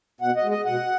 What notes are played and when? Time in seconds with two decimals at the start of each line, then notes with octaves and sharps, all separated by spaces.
0.21 B2 F#5
0.37 D#5
0.44 G#3
0.51 D#5
0.66 B2 F#5